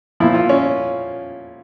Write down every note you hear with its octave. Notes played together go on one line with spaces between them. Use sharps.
A#2 F3 E4
F4
C#4